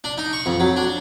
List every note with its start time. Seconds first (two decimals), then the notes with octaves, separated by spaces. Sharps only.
0.04 D4
0.18 D#4
0.33 C#6
0.46 F2
0.60 F#3
0.76 D4